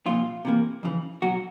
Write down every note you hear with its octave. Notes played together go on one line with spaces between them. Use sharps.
C2 A#2 F3 F4
C3 E3 G3 A#3
F2 C#3 E3
C#2 B2 F#3 F#4